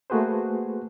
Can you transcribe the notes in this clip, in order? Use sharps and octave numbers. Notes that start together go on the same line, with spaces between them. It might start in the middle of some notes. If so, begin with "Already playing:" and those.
A3 A#3 F#4 G#4 B4 C5